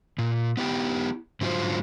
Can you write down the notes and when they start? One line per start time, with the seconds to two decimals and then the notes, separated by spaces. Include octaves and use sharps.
0.18 A#2
0.57 B3 E4 G4 G5
1.41 G#2 D3 F#3 E4 F4 C5